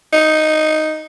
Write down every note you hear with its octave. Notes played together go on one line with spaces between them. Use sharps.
D#4